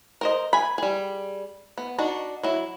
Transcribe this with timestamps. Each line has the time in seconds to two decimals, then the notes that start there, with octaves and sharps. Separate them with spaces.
0.21 A#4 C5 D#5
0.53 G#5 B5
0.78 G3 G#4
1.78 B3
1.99 D4 D#4 F#4
2.44 F#3 E4